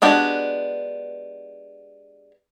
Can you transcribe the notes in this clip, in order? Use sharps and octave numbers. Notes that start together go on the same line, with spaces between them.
G#3 B3 D4 F#4 G4